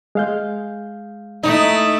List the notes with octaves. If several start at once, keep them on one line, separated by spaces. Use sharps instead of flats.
G#3 F5 G6
A3 D#4 E4